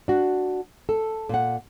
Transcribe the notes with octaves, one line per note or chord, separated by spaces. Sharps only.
D4 F#4
A4
A#2 F#5